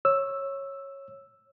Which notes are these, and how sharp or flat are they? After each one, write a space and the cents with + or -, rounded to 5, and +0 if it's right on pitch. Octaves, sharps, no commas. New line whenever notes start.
C#5 -15 E6 +0